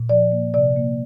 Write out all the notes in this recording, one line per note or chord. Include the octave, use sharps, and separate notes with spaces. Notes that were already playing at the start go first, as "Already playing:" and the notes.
Already playing: A#2
F3 D5
A#3
C3 D5
A#3